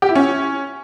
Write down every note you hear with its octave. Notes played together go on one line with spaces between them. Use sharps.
G4
E4
C#4